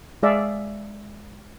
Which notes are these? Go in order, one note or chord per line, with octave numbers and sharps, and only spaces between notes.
G#3 G#4 D5 E5 F5